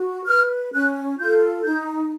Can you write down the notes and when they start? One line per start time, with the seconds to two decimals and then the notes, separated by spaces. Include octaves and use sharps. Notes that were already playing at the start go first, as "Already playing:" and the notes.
Already playing: F#4
0.26 B4 F6
0.73 C#4 F#6
1.19 F4 A4 G6
1.64 D#4 G6